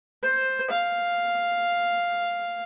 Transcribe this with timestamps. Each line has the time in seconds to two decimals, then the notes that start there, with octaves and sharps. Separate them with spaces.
0.24 C5
0.71 F5